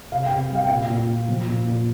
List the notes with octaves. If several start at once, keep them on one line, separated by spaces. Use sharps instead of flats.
C3 F5
G5
C3
G3
F5
G5
A#2 F5
A#2
A#2
F3
A#2
A#2